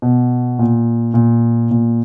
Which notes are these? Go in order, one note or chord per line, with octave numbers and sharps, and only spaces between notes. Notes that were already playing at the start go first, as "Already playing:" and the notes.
B2
A#2
A#2
A#2